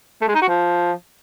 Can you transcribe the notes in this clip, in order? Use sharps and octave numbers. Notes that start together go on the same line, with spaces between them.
A3
G#3
D#4
F#4
F3